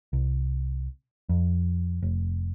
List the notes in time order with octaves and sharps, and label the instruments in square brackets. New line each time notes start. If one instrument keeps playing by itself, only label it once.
[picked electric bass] C2
F2
F1